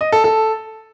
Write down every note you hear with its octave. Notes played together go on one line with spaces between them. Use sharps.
D#5
A4
A4